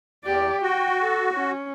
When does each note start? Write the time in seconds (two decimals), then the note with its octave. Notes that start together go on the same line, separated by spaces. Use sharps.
0.25 E2 G4 D5
0.62 F#4 G5
1.02 A4
1.34 C#4